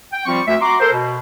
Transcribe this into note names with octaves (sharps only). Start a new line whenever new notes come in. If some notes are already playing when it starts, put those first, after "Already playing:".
G5
F3 G3 C4 F4 C#6
D2 E5
F#4 A#5 C6 D6
A4 A#4 C5
B2